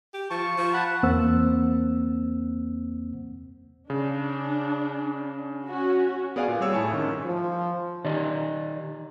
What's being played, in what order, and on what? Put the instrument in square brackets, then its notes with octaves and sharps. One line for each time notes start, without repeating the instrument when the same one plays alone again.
[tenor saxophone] G4
[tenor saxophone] F3 [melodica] A5 C#6
[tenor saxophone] F3
[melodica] F#5 A5 B5
[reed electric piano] E2 A#3 C4 C5 F#5 E6
[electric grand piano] C#3 [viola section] D4
[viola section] C#4 F#4
[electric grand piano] B3 G#4 D5 F5 F#5 G#5
A#2
G3 C4 G#4 C#5 E6
A2 E4 G#5 A5 C#6
G#2 D#3 G#3 C#4
[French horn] F3
[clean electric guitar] D#3 D#4 G4 D5 D#5